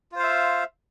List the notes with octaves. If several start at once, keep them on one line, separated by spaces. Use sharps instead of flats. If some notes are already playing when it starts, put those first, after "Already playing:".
F4 C5 E5 F5